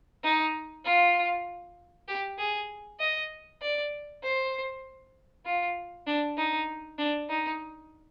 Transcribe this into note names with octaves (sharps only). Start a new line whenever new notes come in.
D#4
F4
G4
G#4
D#5
D5
C5
F4
D4
D#4
D4
D#4